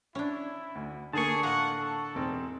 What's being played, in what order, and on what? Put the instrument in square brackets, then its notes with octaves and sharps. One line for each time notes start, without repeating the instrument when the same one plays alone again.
[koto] C#4 D4 [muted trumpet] E4
[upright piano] D2
[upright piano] D3 A#3 [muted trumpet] G#4 [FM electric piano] A5 C#6
[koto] A2 F4 A#5 [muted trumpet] F#5
[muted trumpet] A4
[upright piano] E1 C4